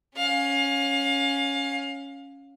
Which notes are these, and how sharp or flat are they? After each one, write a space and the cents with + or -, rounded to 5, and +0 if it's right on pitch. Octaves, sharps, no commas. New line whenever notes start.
C#4 +0 F5 +25